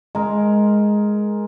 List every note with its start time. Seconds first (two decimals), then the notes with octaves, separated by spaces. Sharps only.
0.15 G#3 A#4